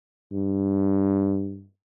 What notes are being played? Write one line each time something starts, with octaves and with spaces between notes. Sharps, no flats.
G2